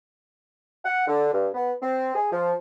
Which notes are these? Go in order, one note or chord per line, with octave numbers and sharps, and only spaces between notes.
F#5
D3
G2
B3
C4
G#4
F3